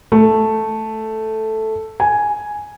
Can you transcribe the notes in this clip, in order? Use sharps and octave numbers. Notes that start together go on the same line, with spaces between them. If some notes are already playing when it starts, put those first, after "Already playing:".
A3
G#5